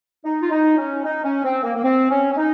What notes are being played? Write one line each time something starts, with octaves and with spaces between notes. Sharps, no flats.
D#4
F4
D#4
C#4
D#4
C#4
C4
A#3
A#3
C4
C#4
C#4
D#4